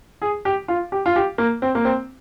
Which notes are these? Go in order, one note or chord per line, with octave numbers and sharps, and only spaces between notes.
G#4
G4
F4
G4
F4
G4
A#3
C4
A#3
C4